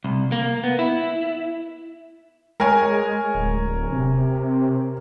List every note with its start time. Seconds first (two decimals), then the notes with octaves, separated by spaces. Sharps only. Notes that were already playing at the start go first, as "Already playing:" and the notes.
0.04 C2
0.32 A#3
0.64 B3
0.79 E4
2.60 G#3 A#4 C#5 G#5
3.35 D1
3.92 C3